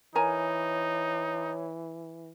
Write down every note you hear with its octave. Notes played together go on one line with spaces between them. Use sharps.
E3 D#4 A#4 C#5 G#5 A#5